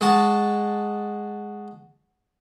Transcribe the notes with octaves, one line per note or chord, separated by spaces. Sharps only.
G#3 F#4 A5